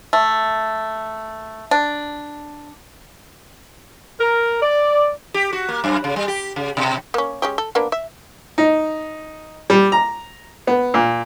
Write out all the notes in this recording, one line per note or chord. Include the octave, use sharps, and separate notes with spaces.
A3
D4
A#4
D5
G4
F#4
A#3
F#2
C#3
G3
G4
C#3
B2
A#3 C#4
G#3 C#4 G4
A4
A#3 B3 D4
E5
D#4
G3
A#5
B3
A#2